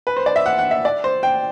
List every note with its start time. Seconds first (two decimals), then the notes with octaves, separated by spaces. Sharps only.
0.07 B4
0.17 C5
0.26 D5
0.36 E5
0.46 F#5
0.59 F#5
0.71 E5
0.85 D5
1.04 C5
1.23 G5